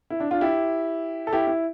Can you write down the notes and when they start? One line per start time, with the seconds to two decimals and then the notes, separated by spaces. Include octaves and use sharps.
0.10 E4
0.20 D4
0.31 D4 F4
0.41 E4 G4
1.27 A4
1.32 E4 G4
1.47 E4